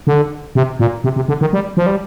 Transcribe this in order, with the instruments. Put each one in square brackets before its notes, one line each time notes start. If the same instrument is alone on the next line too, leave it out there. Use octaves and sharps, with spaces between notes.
[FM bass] D3
C3
A#2
C3
C3
D3
D#3
G3
F3
G3